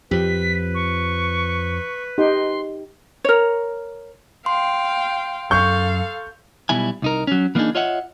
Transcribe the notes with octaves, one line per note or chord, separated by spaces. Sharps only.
F2 F3 G4 B4 B6
C#6
D#4 G4 G5 C6
A#4 C#5
F5 G5 C6
F#2 A4 F5 C#6 G6
B1 B2 G3 E4 G#5
C2 D#4 A#4
F#3 C#4
E3 A#3 B3 D4 D#4 G#4
F4 C#5 D#5 E5 F#5